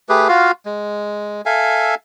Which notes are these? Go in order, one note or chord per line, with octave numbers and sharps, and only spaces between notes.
A3 G4 G#4 B4
F4 F#4 F5
G#3
A4 E5 F5 G#5